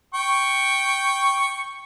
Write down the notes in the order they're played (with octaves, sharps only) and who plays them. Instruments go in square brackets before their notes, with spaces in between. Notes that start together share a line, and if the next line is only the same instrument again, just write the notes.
[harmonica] G5 C#6